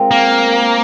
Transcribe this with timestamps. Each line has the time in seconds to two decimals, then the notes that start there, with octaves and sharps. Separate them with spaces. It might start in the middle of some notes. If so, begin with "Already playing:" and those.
Already playing: G#3 C4 F4 A#4
0.11 A#3